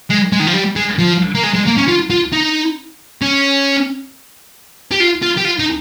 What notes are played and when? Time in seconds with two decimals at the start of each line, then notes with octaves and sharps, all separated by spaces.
0.10 G#3
0.32 G#3
0.40 D#3
0.47 F3
0.54 G3
0.76 G#3
0.99 F3
1.35 A#3
1.43 G#3
1.54 G#3
1.66 A#3
1.77 C#4
1.88 F4
2.10 F4
2.33 D#4
3.22 C#4
4.92 G4
5.00 F4
5.23 F4
5.37 G4
5.45 F4
5.59 D#4